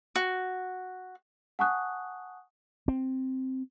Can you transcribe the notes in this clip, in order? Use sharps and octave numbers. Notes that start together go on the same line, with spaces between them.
F#4
F#5 G#5 A5 C#6 D#6 F#6
C4